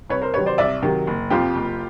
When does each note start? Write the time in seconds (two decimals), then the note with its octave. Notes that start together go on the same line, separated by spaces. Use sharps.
0.10 C2 B4 C#5
0.22 A#4 C5
0.34 C3 D#3 F#3 B4 C#5
0.46 C5 D5
0.58 C2 D5 E5
0.82 C3 D#3 F#3
1.07 F#1
1.30 F2 C3 F3 F4 G4
1.56 F#1